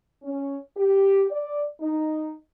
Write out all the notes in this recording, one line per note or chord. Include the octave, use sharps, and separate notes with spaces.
C#4
G4
D5
D#4